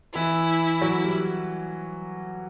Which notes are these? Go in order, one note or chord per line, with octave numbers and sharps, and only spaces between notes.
E3 E4
F#3
G3